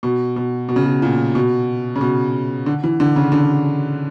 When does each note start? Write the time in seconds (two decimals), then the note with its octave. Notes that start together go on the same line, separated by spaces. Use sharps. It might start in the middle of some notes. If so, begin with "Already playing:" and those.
0.03 B2
0.36 B2
0.69 B2
0.76 C#3
0.84 B2
1.02 A#2
1.35 B2
1.96 C#3
2.01 B2
2.66 D3
2.84 E3
3.00 D3
3.16 C#3
3.32 D3